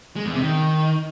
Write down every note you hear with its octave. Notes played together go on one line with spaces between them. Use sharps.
G#3
E2
C3
D#3